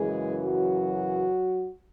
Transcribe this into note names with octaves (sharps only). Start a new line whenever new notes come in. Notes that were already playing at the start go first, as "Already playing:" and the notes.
Already playing: F#2 C#3 E3 G#3 G#4
F#3 F#4